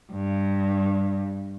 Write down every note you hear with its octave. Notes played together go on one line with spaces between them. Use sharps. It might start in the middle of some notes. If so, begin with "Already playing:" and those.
G2